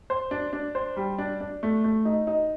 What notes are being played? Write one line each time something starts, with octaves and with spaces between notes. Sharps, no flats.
C5
D4
D4
C5
G3
D4
D4
A3
A3
D#4
D#4